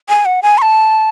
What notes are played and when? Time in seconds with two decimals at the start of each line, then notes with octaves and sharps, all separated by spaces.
0.09 G#5
0.25 F#5
0.43 G#5
0.58 C#6
0.62 A5